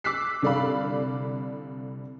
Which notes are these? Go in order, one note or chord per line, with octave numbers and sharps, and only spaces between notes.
D6 E6 F#6 B6 C7
C2 D3 D5 F5 B5